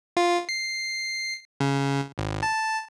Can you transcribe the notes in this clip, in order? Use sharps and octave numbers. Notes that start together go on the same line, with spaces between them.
F4
C7
C#3
G#1
A5